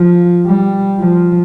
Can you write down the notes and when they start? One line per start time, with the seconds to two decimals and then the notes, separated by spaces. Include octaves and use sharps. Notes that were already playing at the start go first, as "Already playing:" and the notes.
Already playing: F3
0.46 G3
1.00 F3